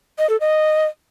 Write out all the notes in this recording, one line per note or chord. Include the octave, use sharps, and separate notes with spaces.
D#5
A4
D#5